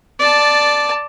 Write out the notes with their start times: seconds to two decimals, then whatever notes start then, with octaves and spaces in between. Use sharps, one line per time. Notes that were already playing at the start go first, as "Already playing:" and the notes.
0.19 D5 A5